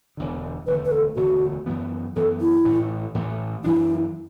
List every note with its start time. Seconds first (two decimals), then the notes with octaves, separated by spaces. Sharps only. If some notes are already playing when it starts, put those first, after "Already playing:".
0.17 E1 E2 D3
0.66 E1 D2 D3 A3 B4
0.85 B4
0.91 A4
1.16 E1 D2 D3 A3 F#4
1.66 F#2 E3 B3
2.16 F#2 E3 B3 A4
2.41 E4
2.65 A1 A2 E3 A3
3.14 A1 A2 E3 A3
3.64 F#2 E3 D4 E4